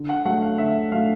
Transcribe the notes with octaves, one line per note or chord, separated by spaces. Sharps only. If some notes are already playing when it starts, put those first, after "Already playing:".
Already playing: D3
F#5
F#3 A3 F#5
F5
D3 E5
F#3 A3 F5